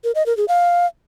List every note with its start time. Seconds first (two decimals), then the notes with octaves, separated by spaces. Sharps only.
0.04 A#4
0.15 D#5
0.26 A#4
0.37 G#4
0.48 F5